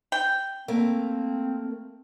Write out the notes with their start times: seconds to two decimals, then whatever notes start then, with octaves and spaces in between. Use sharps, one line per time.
0.12 G5
0.68 A3 A#3 C4